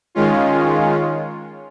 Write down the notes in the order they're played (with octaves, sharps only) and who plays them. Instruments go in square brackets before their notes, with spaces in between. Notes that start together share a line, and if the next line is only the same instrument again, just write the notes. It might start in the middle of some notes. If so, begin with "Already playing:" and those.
[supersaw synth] D#3 G#3 C#4 F4